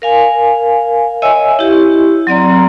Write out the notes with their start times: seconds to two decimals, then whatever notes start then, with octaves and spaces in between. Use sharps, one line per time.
0.02 A#4 F5 G#5
1.22 C#5 D#5 E5 G#5 E6
1.59 E4 G4
2.27 F#3 C4 D5 A#5